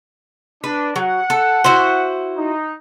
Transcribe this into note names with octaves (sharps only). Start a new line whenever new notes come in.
D4 B4
F#3 F#5
A4
E4 F#4 C5
D#4